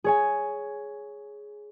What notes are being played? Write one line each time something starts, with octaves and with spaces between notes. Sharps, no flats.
G#4 C#5 G#5